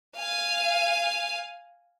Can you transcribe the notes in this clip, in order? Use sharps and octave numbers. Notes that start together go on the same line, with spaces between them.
F5 G#5